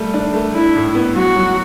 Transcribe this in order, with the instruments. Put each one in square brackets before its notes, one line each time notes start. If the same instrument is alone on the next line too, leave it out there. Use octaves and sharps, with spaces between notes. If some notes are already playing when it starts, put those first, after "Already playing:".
Already playing: [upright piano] G3 A3
D4
A3
[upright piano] D4 [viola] E4
[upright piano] A2
B3
[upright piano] F#3 [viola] F#4
[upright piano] F#3